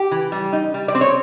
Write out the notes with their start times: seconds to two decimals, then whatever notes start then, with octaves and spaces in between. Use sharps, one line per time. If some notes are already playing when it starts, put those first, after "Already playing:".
Already playing: G4
0.11 E3
0.32 G3
0.53 D#4
0.74 G3
0.88 D5
0.95 C4
1.01 C#5